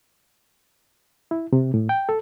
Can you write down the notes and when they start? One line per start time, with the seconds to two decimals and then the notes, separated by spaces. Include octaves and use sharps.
1.31 E4
1.53 C3
1.74 A2
1.89 G5
2.09 A4